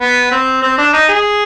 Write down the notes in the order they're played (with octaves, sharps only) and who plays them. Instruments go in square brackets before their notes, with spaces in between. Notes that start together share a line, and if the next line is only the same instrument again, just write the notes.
[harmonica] B3
C4
C4
D4
D#4
G#4